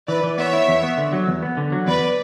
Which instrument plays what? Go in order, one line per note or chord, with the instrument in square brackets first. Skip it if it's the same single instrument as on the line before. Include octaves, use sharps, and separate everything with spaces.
[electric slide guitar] E3 [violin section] B4 D5
[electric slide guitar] E3
[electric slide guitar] B3 [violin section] C#5 E5
[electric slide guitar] E4
E2
B3
D3
F#3
E2
B3
D3
F#3
[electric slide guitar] E2 [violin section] B4 D5